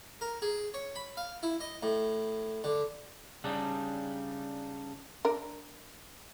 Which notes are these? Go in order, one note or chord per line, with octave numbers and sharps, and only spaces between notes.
A#4
G#4
C#5
B5
F5
E4
D#5
A2
D3
C#3 G3 D4 D#4
D4 A#4